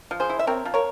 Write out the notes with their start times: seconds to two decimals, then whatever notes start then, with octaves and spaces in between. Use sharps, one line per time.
0.11 F3
0.20 G#4 C5
0.30 E4
0.39 E5
0.47 C4 A#4 C#5
0.65 F3
0.74 A#4 C#5